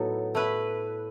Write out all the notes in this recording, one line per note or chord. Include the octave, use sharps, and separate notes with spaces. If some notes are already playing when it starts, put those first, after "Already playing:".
Already playing: A2 F#3 B3 D#4 A4
A3 E4 B4